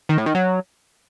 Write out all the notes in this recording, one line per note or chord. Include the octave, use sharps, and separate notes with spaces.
D#3
A2
D#3
F#3